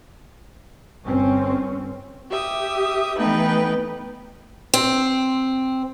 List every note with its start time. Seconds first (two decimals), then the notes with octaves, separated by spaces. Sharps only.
1.03 G1 C4 C#4
2.30 G4 E5 D#6
3.18 E3 A3 B3 D#4 B4 G5
4.74 C4